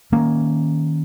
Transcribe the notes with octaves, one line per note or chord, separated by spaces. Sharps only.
D#3 A#3 C#4